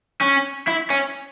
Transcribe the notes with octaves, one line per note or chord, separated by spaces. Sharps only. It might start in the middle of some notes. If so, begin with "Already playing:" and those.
C#4
E4
C#4